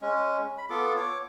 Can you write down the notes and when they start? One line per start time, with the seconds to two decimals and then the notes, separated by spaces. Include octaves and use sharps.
0.02 G#3 C#4
0.58 B5
0.70 B3 F4 A4 D6
0.96 C#5 D6